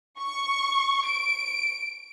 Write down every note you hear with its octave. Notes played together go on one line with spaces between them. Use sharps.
C#6
D7